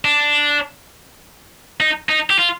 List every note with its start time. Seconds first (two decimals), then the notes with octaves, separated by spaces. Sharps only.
0.05 D4
1.80 D#4
2.09 D#4
2.30 G4
2.39 F4